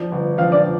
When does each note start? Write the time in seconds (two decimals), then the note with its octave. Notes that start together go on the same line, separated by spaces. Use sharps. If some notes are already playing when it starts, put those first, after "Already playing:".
Already playing: F3 D5
0.12 G1
0.38 F3 F5
0.52 D5